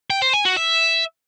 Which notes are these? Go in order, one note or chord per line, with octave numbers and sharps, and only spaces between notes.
G5
C5
G#5
F#4
E5